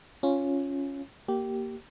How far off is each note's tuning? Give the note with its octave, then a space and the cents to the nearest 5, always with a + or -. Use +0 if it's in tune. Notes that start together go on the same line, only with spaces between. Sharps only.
C#4 +0 F4 +0
A#3 +0 G4 -15